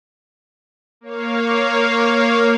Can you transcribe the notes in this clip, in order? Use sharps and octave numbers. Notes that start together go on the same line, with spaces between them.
A#3 C#5 F5